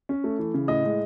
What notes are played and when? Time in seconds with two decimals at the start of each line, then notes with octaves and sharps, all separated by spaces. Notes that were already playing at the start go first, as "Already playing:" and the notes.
0.09 C#4
0.24 A3
0.39 E3
0.54 C#3
0.68 A2 D#5
0.84 G#3